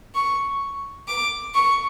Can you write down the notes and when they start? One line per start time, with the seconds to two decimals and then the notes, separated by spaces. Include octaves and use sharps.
0.15 C#6
1.08 D6
1.54 C#6